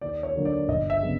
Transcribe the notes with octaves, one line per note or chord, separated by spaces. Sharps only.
D#2 D5
C#5
D3 F#3 A#3
D5
G1 D#5
E5
C#3 F#3 B3